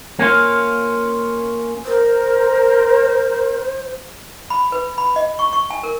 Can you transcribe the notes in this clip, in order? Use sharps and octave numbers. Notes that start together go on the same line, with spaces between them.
A#3 C#4 F4
A#4 C5
B5
B4
B5
D#5
C#6
C#6
G#5
A#4